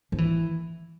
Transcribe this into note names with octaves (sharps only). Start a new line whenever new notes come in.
F3
E3